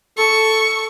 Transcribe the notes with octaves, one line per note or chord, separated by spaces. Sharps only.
A4 C#6